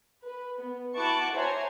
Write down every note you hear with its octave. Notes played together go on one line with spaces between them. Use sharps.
B4
B3
E4 F#4 A5 C#6 D6 F#6
C5 C#5 E5 G#5 A#5 C6